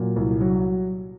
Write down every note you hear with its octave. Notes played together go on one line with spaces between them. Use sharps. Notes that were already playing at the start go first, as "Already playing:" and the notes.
Already playing: A#2 F#3
C2
F#3